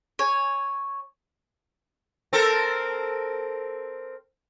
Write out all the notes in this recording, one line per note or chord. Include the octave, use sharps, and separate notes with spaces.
C#5 G#5
C4 A4 A#4